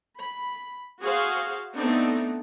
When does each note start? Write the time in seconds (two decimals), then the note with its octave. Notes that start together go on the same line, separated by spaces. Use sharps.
0.19 B5
1.01 F#4 G#4 C5 F5
1.74 A3 B3 C4 D4 D#4